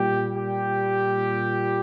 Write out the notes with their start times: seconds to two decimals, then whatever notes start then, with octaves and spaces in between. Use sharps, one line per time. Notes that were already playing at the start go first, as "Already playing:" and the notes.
Already playing: A#2 G3 G4
0.34 G4